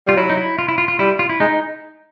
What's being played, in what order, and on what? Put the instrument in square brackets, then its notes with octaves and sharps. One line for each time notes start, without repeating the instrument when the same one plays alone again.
[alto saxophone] G3 [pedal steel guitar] F4
[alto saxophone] F#3 [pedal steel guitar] E4
[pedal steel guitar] D#4
E4
F4
E4
F4
F4
[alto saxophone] G3 [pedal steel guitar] E4
[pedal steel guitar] F4
E4
[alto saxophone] G#3 [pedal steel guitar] D#4